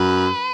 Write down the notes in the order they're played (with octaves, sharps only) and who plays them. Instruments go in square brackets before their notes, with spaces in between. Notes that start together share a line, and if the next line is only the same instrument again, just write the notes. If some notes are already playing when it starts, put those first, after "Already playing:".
Already playing: [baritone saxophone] F#2 [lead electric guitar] B4